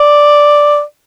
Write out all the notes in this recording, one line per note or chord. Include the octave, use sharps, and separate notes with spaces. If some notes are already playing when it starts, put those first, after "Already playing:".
Already playing: D5